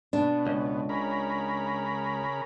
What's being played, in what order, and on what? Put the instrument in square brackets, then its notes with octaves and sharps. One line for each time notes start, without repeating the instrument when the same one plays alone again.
[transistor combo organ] B2 [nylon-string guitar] D4
[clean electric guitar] C#2
[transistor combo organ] C#3 A#4 B5